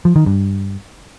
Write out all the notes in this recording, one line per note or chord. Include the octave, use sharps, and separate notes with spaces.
F3
D#3
G2